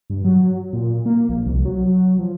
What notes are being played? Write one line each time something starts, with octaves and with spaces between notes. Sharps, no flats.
G2
F#3
A#2
A#3
A#1
C2
F#3
F3